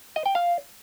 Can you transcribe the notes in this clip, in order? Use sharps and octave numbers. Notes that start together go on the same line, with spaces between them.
D#5
G5
F5